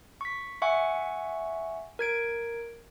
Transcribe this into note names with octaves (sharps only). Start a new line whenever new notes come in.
C#6 B6
E5 F#5 G#5 C#6
A#4 G#6 D7